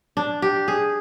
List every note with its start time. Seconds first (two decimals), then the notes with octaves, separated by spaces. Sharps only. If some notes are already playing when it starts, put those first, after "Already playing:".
0.17 D4
0.42 G4
0.68 G#4